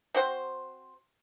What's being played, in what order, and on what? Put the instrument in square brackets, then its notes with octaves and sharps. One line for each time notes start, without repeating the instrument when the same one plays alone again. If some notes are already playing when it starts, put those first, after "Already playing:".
[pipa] C4 F#4 C5